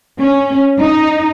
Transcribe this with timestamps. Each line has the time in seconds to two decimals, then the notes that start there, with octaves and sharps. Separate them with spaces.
0.19 C#4
0.79 D#4